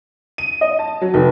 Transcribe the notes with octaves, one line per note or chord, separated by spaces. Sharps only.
D#7
D#5
A5
F#3
F1